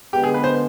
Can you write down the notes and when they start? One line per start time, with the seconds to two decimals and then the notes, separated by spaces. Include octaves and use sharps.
0.13 D3 F3 G#3 B3 G4
0.24 G#4
0.34 B4
0.44 C5